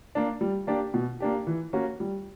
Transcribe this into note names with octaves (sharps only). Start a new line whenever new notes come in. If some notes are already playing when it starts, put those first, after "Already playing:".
A#3 D4
G3
A#3 D4 G4
B2
A#3 D4 G4
E3
A#3 C#4 F#4
G3